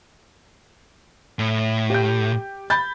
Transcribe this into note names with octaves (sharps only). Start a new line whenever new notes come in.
A2
G4 G6
B5 G6 A6